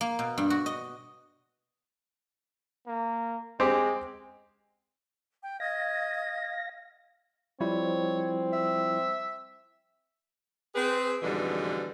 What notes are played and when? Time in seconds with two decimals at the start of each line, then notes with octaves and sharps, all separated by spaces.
0.01 A#3
0.19 B2
0.38 G2
0.50 F#4
0.66 D#5
2.87 A#3
3.60 G#3 C4 G4
5.42 G5
5.60 D#5 F5 G#6 A#6
7.60 F3 G3 C4 E4 C#5
8.53 E5
10.75 C4 G#4 B4
11.22 F2 G#2 B2 D3 E3 G3